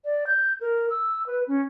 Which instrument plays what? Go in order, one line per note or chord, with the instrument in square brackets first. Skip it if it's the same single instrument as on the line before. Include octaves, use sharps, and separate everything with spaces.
[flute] D5
G6
A#4
E6
B4
C#4